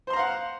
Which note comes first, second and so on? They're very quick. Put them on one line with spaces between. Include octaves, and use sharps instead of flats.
C5 C6 A#5 F5 F#5